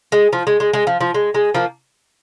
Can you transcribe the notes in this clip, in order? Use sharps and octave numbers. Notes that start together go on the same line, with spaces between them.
G#3
F3
G#3
G#3
G#3
F3
F3
G#3
G#3
F3 A#3